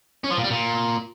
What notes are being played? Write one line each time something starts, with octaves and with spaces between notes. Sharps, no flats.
C#4
F3
A#2
G3
A#2